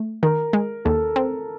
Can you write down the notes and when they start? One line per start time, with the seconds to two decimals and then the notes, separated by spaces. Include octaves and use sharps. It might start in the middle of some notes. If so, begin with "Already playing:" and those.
Already playing: A3
0.23 D#3 A#4
0.53 G#3
0.85 D#2 A4
1.16 C4